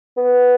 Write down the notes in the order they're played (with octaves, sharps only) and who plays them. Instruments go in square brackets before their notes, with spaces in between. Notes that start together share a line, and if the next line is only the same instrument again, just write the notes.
[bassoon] B3